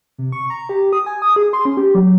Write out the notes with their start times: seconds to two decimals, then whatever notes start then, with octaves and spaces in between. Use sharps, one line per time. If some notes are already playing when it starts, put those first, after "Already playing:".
0.18 C3
0.32 C#6
0.50 A#5
0.69 G4
0.93 D#6
1.06 G#5
1.22 D#6
1.36 G#4
1.53 C6
1.65 C#4
1.77 G4
1.95 F#3